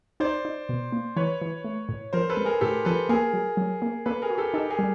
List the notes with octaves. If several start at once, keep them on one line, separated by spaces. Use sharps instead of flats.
D#4 C5 D5
D#4
B2
A#3
E3 B4 C#5
E3
A3
A2
F3 A#4 C5
A4 B4
G#3
G#4 A#4
A2 G4 A4
F3 A4 B4
A#3 G#4 A#4
F#3
F#3
A#3
A#3 A4 B4
G#4 A#4
F#4
G4 A4
D#4 G4 A4
G#4 A#4
G3